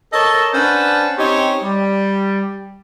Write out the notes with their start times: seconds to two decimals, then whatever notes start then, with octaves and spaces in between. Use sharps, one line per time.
0.13 A4 A#4 C#5 D#5 A5
0.54 C#4 D4 B4 C5 F#5 A5
1.18 C4 C#4 D#4 G4 C#5
1.63 G3